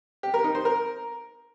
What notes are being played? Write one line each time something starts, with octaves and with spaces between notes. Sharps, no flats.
G4
A#4
D#4
C5
A#4